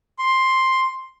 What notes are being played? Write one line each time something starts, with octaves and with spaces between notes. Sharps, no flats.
C6